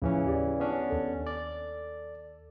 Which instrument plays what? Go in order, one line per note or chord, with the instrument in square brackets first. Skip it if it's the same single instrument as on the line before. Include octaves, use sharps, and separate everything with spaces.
[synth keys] D#2 A2 F3 [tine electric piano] C#3 E3 C#4
[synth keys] G4 D5
[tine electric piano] B3 C#4 D4
[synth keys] D#2 A4
[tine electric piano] D5